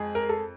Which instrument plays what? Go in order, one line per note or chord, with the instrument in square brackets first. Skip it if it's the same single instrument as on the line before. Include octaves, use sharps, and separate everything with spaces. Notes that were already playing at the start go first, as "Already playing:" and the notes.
Already playing: [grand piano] F2 G#3 G#4
A#4
A4